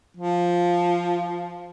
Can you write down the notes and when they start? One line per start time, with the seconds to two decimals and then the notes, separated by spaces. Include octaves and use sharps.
0.17 F3